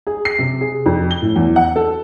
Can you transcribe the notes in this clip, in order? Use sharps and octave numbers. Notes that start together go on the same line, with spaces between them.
G#4
C7
C3
G#4
F2
G7
A2
E2
F#5
A4